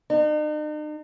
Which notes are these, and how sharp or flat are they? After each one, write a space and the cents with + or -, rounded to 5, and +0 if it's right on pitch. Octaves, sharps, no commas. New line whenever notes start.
D#4 -45